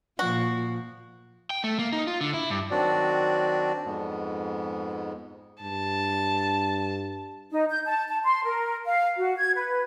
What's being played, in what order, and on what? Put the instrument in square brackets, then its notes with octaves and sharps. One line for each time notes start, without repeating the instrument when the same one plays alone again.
[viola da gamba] A#2 F3 [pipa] F#4
[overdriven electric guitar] G5
A3
A#3
D#4
F4
D3
E4
G2
[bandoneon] D#3 F#3 C4 D4 F#4 D5
F2 G#2 G#3 B3
[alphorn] G2 [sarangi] A5
[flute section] D#4
G6
A5
A5
C6
A#4
F5
F#4
G#6
B4